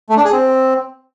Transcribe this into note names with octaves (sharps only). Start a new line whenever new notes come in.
A3
D4
G#4
C4